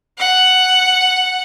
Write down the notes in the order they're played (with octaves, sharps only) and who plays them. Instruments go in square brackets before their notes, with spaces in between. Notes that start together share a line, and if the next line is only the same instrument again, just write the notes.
[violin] F#5